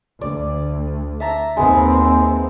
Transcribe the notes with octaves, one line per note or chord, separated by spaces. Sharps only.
D2 D5
E5 A5 A#5
D#2 G#3 B3 C4